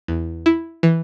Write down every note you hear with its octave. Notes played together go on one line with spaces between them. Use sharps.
E2
E4
E3